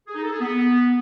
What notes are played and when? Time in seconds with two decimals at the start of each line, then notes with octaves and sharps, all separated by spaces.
0.07 G#4
0.15 D#4
0.23 A4
0.31 G#4
0.39 B3